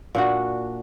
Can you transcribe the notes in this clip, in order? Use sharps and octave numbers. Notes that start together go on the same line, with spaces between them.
A#2 D4 F#4